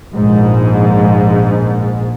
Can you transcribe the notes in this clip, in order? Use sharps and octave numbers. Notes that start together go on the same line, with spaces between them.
A#1 G#2